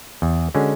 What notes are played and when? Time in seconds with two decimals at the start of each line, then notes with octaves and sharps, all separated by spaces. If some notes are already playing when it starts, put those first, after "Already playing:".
0.22 E2
0.54 D3 G#3 C#4 F#4